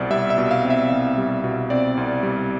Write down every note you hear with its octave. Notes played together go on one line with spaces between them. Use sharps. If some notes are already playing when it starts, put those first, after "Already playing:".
Already playing: C2 B2 C4 D5
G3 E5
E5
B2
F5
C4
E5
C2
G3
B2
C4 D5
C2
G3